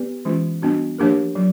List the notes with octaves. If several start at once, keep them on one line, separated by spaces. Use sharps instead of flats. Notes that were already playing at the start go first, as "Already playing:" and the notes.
Already playing: B3 G4 B4 D5
E3 G#3 C#4 F4
G3 B3 D4 F#4
F3 A#3 D4 G4 A#4
F#3